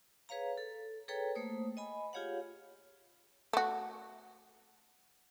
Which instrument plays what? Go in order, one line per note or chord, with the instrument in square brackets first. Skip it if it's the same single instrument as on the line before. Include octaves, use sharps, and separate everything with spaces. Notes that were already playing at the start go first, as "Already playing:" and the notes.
[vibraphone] G#4 B4 C#5 F5 A#5
A4
G#4 A4 B4 C#5 G5 A#5
A3 A#3 C5 D#6
D#5 G#5 B5
F4 G4 G#4 C#5 F5 F#5
[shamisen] A3 F#4